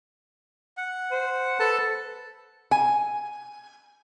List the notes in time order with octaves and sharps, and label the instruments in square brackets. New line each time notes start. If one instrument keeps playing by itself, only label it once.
[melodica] F#5
[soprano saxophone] C5
[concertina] A4 A5 [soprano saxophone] B4
[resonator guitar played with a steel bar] G#5